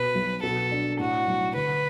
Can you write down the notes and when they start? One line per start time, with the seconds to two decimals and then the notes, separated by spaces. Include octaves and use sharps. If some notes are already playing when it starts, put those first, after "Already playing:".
Already playing: B2 B4
0.15 B1
0.42 B2 A4
0.71 D4
0.99 A2 F#4
1.27 B1
1.55 D3 B4